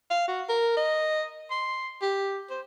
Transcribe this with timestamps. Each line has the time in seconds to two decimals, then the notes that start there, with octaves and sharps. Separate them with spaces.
0.11 F5
0.28 F#4
0.49 A#4
0.77 D#5
1.51 C6
2.02 G4
2.50 C5